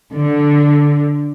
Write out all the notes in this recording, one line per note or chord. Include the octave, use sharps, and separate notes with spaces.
D3